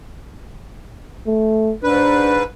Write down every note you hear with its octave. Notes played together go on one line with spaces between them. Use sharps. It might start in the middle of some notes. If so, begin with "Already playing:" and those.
A3
G#2 D4 B4